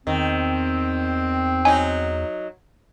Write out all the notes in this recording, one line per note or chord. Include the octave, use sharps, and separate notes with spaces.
E2 D#3 C4
F#3 D#4 G#5